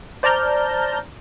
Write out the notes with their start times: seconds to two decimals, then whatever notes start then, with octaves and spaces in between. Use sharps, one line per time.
0.23 C5 D5 A5 A#5 F6 G6